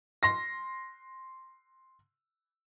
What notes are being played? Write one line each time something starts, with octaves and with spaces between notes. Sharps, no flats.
C6 A#6